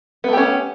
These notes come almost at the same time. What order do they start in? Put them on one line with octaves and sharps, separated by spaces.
B3 A3 G4 C#4